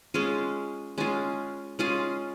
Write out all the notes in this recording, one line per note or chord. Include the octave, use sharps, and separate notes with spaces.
G#3 C#4 F4 G#4
G#3 C#4 F4 G#4
G#3 C#4 F4 G#4